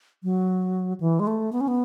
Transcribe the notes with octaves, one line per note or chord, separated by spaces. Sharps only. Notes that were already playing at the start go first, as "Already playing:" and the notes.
F#3
E3
G#3
A3
B3
C#4
B3